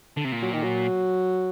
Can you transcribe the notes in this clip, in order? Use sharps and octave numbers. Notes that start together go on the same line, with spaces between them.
D3
C3
A#2
F#3
D#3
F#3